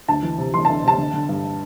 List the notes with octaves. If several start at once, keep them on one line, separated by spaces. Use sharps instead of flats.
D2 A5
E3
C3
E3 C6
A5
D2
C3 A5
D3
D3
G2